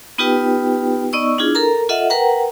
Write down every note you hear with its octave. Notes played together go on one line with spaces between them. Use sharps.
B3 D#4 F4 G4 B4 G5
B3 D#4 D5 D#5 C#6 E6
D4 E4 F4 G#4
A4 A#4 A#5
F4 A4 D#5 E5 F#5
A#4 B4 F#5 G5 A#5